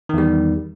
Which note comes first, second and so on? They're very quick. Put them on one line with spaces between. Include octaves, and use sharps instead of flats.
D#3 E2 G3